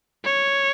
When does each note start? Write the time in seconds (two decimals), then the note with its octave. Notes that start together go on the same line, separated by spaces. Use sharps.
0.25 C#5